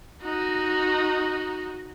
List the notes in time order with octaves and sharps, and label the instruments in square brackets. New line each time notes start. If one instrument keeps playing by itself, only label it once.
[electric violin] D#4 F#4